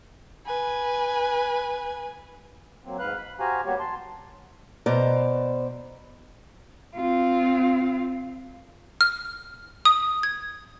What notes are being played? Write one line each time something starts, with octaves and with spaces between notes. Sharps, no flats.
B4 G#5
F#3 A#3 C4
G#2 B4 F5 F#6
B5
F#4 G4 C5 F5 G#5 A#5
G3 A#3 B3 F#4 G4 C#5
A5 C6
B2 C5 D5 A#5
C4 F4
F6
D#6
G#6